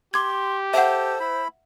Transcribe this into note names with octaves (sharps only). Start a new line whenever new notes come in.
G4 C6 D6 G#6
A4 C5 E5 F#5
E4 B5